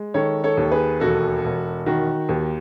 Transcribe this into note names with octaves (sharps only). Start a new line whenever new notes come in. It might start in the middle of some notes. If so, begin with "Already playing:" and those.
Already playing: G#3
D#3 A4 C#5
A4 C#5
D#2
G#4 B4
E1 F#4 A4
E1
D#3 F#4
D#2